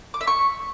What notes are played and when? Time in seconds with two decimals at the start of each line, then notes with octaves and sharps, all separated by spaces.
0.14 D6
0.21 E5
0.27 C#6